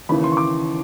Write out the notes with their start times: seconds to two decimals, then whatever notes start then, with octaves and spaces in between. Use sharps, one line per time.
0.09 D#2 C#3 E3 B5
0.24 C6
0.32 C#6
0.37 D6